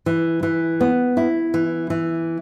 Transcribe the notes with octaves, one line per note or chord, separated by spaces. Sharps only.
E3
E3
B3
E4
E3
E3